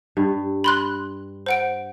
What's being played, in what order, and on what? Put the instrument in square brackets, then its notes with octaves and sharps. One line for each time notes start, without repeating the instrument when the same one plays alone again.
[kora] G2
[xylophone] B5 C6 F#6
C5 F#5 D7